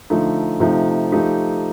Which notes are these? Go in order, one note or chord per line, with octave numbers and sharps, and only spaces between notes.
D3 F3 A3 D#4
C3 F3 A3 D#4
F3 A3 D#4 G4